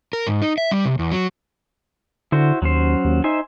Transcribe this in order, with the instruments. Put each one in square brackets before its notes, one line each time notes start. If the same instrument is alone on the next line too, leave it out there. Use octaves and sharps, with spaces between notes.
[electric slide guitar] A#4
G#2
D#4
E5
G3
C3
E2
F#3
[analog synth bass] D3 [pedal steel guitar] E4 F#4 C5
[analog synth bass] D#2 [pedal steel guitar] F#3 C#4 C5
[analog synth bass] D#2
[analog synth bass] D#4 [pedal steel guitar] C5 E5 G#5